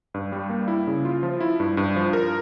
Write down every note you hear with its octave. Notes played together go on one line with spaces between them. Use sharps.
G2
G3
A#3
E4
C#3
F4
F3
E4
G2
G2
F3
A#4